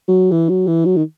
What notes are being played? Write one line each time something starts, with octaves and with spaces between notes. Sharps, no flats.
F#3
E3
F#3
E3
F#3
D#3